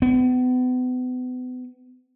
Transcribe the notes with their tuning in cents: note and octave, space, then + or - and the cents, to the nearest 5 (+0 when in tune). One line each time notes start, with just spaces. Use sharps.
B3 +35